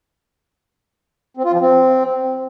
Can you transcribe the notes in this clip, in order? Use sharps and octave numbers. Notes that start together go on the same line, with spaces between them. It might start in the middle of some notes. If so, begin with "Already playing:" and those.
C4
F4
F3
C4